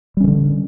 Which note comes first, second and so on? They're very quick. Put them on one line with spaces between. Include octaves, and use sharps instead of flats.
G3 C#4 D#3 D3